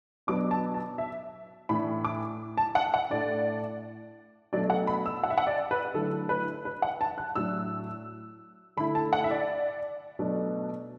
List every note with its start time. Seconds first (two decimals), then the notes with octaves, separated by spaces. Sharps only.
0.27 B2 F#3 B3 D4 D6
0.51 A5
0.74 A5
0.98 E5
1.69 A2 E3 D4 B5
2.05 D6
2.57 A5
2.75 F#5
2.94 F#5
3.10 A2 A3 D4 D5
4.53 B2 F#3 A3 D4 D5
4.70 F#5
4.87 B5
5.06 E6
5.24 F#5
5.30 E5
5.38 F#5
5.47 D5
5.71 B4
5.94 D3 F#3 A3 E4 A4
6.29 B4
6.65 B4
6.82 F#5
7.01 A5
7.18 F#6
7.35 A2 F#3 D4 E6
8.77 D3 A3 E4 B5
8.95 A5
9.13 F#5
9.24 E5
9.31 D5
10.19 B2 F#3 A3 D4